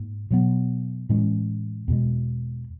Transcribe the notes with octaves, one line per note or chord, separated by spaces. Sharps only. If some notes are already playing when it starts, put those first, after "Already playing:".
Already playing: G#2 A#3
B2 F#3 B3
A2 E3 G#3 C#4
E2 B2 G#3